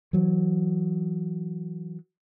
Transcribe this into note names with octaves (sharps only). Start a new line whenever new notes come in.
E3 F#3